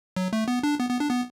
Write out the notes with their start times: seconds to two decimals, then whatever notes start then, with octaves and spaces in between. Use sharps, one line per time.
0.16 F#3
0.33 A3
0.48 B3
0.63 D4
0.79 B3
0.90 B3
1.00 D4
1.10 B3